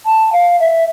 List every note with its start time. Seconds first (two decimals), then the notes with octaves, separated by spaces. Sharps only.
0.06 A5
0.33 F5
0.60 E5